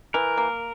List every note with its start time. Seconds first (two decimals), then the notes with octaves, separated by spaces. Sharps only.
0.14 E3 A#4
0.37 A#3